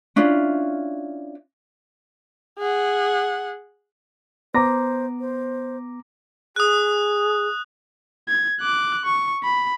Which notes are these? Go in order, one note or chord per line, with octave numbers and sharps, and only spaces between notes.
C#4 D4 E4 F4
G#4 F#5
B3 C5 A#5 D6 A#6
C5
G#4 D#6 F#6
G#6
D6 F#6
C#6
B5